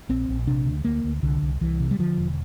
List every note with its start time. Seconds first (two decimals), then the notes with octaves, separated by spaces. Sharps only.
0.09 A#1 C4
0.29 A#1
0.47 C3 D4
0.66 D2
0.85 D2 A#3
1.04 D2
1.23 C2 D3
1.42 C2
1.61 C2 E3
1.80 C3
1.91 G3
1.99 D3 F3
2.18 E1